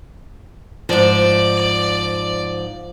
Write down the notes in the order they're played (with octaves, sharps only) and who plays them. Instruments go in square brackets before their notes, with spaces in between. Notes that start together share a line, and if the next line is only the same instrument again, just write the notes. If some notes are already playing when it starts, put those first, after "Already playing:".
[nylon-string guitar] G#2 F3 [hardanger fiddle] D5